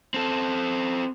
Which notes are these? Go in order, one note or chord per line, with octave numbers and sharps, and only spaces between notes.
C4 A4